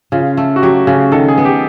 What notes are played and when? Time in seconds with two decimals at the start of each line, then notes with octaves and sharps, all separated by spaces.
0.12 C#3 F4
0.37 A3
0.56 F#4
0.62 F#3 G4
0.87 C#3 G#4
1.12 D#3 A4
1.28 G#4
1.38 B3
1.45 G4